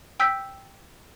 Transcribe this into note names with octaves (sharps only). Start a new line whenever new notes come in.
G5 E6 G6 B6